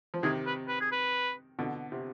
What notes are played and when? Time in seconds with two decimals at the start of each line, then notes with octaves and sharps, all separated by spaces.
0.14 F3
0.23 C3 D#3 G#4
0.46 B4
0.68 B4
0.81 G#4
0.92 B4
1.59 B2 D3
1.92 C3